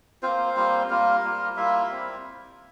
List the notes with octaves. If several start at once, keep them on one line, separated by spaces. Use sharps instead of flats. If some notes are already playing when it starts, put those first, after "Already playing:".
A#3 C4 F4 C5
G3 A#3 F4
G3 A#3 F4 A#4
G3 A#3 F4
G3 A#3 E4 F4 E5
G3 C4 E4